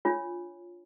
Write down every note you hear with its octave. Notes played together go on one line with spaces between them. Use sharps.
D4 F4 C#5